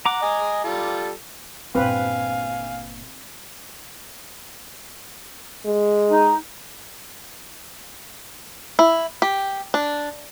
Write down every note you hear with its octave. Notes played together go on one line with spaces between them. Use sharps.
F#5 A#5 D6
D#5 G#5
G3 F4 A4
G1 A#2 C4 B4 F5 G#5
G#3
D#4
E4
G4
D4